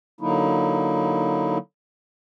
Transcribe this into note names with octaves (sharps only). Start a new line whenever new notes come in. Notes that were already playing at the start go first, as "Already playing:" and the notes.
D3 F#3 A#3 D#4 E4